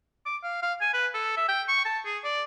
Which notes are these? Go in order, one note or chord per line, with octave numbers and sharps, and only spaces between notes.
D6
F5
F5
G#5
B4
A4
E5
G5
C#6
A5
G#4
D5